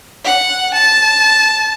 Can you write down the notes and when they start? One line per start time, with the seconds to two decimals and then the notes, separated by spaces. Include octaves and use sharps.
0.25 F#5
0.75 A5